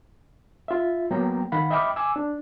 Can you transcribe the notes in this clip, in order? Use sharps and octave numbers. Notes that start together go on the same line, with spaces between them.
F4 E5
F#3 A#3 B3 G5 A#5
D#3 F5 F#5 B5
D#5 E5 G5 B5 D6 F6
G#5 D6 E6
D4